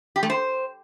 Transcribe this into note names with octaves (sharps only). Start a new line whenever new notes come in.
G4
A3
C5